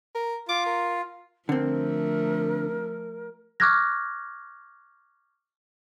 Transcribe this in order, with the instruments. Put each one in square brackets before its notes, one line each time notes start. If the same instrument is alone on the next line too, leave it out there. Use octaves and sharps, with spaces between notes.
[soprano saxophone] A#4
[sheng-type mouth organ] F4 [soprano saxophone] D6
[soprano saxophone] A#4
[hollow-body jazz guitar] D3 C4 [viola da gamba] F3 A3 [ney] A#4
[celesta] C#6 D6 F6 F#6 G#6 A#6